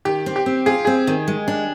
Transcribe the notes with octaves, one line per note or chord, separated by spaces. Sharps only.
D#3 G4
C4
G4
C4
F4 G#4
C4 G#4
D#3
G#3
D4